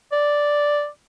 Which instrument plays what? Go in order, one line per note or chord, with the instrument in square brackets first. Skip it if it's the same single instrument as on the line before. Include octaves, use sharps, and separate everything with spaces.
[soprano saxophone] D5